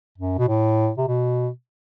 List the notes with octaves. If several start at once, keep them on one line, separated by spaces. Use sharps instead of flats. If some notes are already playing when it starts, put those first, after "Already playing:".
F#2
B2
A2
C3
B2